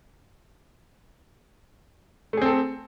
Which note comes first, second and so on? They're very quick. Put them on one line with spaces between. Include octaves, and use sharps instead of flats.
A3 G#4 C4 A4